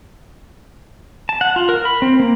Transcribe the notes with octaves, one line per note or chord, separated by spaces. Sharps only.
A5
F#5
F4
A#4
B5
C4
A#3